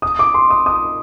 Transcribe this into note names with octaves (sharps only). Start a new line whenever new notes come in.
D#6
D6
C6
D#6
D#6